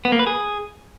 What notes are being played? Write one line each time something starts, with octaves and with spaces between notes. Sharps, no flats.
B3
A#3
B4
G#4